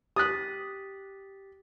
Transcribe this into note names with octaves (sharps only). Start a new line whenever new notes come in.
G4 D#6 F#6 A6 B6